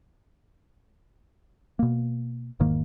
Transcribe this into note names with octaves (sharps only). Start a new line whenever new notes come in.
B2 A#3
E1 G#2 D#3 A#3